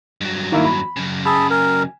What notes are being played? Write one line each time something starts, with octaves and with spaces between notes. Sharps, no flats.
G2 F#3
D#3 A#3 E4
B5
F#2 C#3
G#4 A5 B5 E6
A#4 G#5